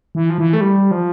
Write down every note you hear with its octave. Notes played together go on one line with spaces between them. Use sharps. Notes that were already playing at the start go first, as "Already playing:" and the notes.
E3
F3
E3
A3
G3
F3